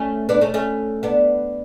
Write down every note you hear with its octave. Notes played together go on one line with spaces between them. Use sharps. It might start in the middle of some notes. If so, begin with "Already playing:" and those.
Already playing: A3 C#4
B3 D4
A3 C#4
A3 C#4
B3 D4